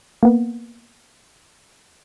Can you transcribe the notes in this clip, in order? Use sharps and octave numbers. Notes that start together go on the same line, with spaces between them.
A#3 B3